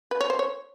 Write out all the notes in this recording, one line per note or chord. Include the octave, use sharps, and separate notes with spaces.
B4
C#5
C5
C#5